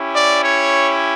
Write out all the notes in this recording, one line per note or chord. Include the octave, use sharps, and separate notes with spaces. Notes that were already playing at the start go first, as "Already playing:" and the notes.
Already playing: C#4 E4 G4
D5
C#5